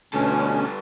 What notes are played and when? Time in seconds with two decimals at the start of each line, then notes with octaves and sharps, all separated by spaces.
0.14 D2 G2 B2 C#4 A4